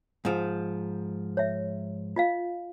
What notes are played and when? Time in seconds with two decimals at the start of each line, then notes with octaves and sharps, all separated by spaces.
0.25 G#2 F3
1.37 C#5 E5
2.16 F4 D#5 F5